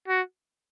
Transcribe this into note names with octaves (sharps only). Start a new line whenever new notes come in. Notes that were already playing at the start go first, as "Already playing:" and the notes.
F#4